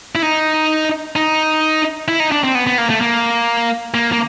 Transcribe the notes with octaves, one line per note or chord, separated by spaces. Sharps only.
E4
D#4
D#4
E4
D#4
D4
C4
B3
B3
A#3
A3
A#3
A#3
A#3